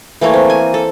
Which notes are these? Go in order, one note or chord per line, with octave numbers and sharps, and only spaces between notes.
E3 A3 A#3 C#5
C4
G#5
A4